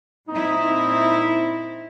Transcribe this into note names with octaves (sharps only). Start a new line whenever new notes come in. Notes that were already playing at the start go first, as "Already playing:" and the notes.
A#2 C4 D#4 E4